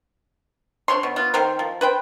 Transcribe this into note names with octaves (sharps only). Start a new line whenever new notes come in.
D4 C5 C#5 C6
B2
B3 F4
D#3 C4 A#4 C5
F3
B4 C5 G5